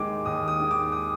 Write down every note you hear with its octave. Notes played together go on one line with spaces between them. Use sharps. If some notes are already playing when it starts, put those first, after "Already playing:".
Already playing: D#2 D#3 G#3 D6
D#2 D#6
D#6
D#3 G#3
D6
D#6